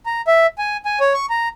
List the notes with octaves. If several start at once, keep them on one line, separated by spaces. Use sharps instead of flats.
A#5
E5
G#5
G#5
C#5
C#6
A#5